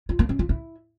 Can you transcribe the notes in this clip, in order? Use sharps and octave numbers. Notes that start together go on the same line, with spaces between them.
F4
A#3
C#4
F4
E4